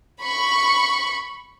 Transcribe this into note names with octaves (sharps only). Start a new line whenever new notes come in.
B5 C#6